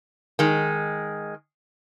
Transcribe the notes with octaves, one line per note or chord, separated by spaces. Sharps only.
D#3 G#3